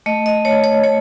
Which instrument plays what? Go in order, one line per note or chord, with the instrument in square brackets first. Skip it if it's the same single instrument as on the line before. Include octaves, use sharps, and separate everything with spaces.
[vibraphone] A3 D#5
D#5
A3 C#5
C#5
A3 C#5